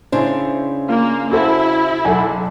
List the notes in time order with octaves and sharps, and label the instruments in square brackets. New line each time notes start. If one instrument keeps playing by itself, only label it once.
[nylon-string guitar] C#3 D4 [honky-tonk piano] E4 C5
[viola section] A#3 [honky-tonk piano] F4
[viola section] E4 [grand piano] F#4 A4 C5
[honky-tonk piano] F#1 B1 [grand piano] A4 F#5 G#5